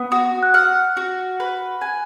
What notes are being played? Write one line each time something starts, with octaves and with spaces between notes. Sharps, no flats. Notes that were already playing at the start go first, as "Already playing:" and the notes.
Already playing: B3 D#6
F#4 D#6
F#6
F#5 F6
F#4
B4
G#5